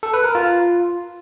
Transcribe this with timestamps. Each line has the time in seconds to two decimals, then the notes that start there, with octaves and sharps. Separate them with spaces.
0.03 A4
0.14 B4
0.24 A#4
0.35 F4